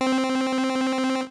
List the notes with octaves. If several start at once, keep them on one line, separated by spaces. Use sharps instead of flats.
C4